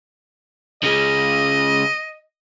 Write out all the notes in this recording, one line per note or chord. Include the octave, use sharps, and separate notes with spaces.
C#3 G#3 D#5